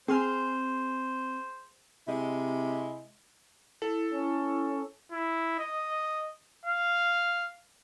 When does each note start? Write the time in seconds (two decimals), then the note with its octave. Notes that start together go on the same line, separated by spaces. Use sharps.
0.08 C4 G#4 C5 G#5 C6 F6
2.08 C3 G#3 E4
3.82 E4 A4
4.13 C#4
5.12 E4
5.59 D#5
6.65 F5